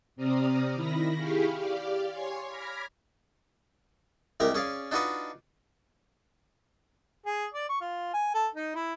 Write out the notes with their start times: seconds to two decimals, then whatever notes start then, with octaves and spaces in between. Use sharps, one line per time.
0.16 C3 C4 D5 A#5 D#6 F6
0.73 D#3 E4 B5 A#6
1.14 E4 G4 G#4 F5 B5 C#6
1.54 G4 D5 F5
2.09 C#5 G#5 C6
2.47 B5 D6 F6 G#6 A#6 B6
4.40 C2 G#3 G4 A#4 A#5
4.54 C#4 G#4 D5 F5
4.91 D4 D#4 F4 F#4 B4 D#5
7.26 G#4
7.54 D5
7.69 C#6
7.81 F4
8.14 G#5
8.34 A4
8.55 D#4
8.75 E4